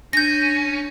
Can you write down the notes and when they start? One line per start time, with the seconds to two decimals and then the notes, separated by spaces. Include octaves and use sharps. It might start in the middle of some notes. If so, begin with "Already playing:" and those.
0.13 C#4 D4 G6 A#6